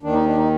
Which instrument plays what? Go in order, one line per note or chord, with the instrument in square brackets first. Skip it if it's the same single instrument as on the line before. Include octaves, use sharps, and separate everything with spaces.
[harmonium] D#2 D#3 D4
D#4
D4
D#4